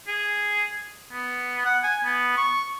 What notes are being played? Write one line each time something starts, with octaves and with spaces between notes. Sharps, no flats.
G#4
B3
F#5
G#5
B3
C#6